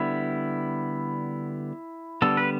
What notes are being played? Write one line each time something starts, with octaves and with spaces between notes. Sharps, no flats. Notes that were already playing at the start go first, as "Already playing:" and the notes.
Already playing: D3 G3 B3 E4
D3 G3 B3 A4
B4